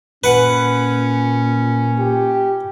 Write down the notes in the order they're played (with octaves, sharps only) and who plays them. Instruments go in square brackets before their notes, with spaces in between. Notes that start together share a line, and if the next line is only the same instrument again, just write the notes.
[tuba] A#2 [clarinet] C#4 [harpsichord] B4 F#5
[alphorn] G4